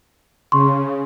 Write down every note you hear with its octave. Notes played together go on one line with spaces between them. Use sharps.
C#3 C6 C#6